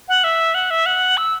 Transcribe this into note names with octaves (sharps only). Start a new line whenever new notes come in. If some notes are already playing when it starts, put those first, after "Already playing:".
F#5
E5
F#5
E5
F#5
E6